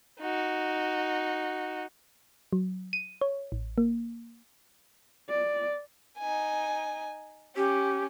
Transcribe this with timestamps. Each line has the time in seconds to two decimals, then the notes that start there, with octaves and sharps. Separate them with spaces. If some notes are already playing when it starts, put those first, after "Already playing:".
0.20 D#4 F#4
2.53 F#3
2.93 D#7
3.21 C#5
3.52 A1
3.78 A#3
5.30 D5
6.19 D#4 G#5
7.56 C#4 G4